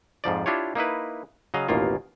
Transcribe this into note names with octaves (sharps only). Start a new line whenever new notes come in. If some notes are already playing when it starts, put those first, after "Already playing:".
F2 G#2 F3 D5
D4 E4 F4 G4 C#5
A#3 D#4 E4 B4
C#3 F#3 D#5 F5
A1 D#2 B2 A#3 F4